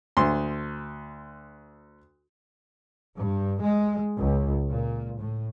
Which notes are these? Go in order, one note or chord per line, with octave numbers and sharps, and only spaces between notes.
D2 C6
G2
G#3
C#2
A#2
A2